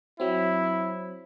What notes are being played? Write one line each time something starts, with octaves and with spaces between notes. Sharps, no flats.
F#3 C4 E4